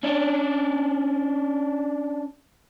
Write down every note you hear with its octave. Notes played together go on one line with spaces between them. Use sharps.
C#4 D4